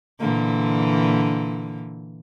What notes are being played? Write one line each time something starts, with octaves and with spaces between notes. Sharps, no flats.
A#2 D3 E3